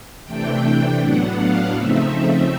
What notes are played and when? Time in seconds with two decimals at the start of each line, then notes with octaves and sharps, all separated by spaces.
0.25 C3 E3 A3 D4 G5
0.99 A2 F#3 B3 D4 F#5
1.37 F5
1.74 C#3 F3 A3 C4 D#4 E5